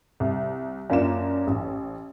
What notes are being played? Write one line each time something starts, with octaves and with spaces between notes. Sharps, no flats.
C2
F#2 A#3 D4 F4 E7
A1